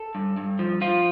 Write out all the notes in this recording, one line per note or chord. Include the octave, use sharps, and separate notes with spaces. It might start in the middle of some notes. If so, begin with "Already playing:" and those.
Already playing: A4
G2
G2
F3
F3 F4